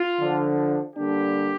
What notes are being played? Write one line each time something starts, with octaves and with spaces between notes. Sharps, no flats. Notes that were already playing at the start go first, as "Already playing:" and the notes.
Already playing: F4
D3 F3 D4
D3 G3 A#3 D4 G4